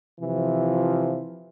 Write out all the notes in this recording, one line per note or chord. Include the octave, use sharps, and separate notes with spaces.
C3 E3 F3